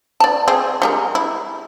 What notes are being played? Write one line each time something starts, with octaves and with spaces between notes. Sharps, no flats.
D5 A5
C4 G#4
G3 G#3 A#4
E4